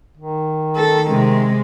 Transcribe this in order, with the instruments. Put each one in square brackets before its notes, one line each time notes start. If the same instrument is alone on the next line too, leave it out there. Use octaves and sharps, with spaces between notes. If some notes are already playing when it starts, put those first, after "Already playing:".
[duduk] D#3
[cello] A4
C3 G#3